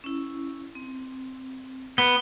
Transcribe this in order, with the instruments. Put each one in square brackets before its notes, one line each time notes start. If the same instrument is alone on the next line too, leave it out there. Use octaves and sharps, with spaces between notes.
[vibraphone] C#4 E4
C4
[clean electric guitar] B3 [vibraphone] B4 [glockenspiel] G7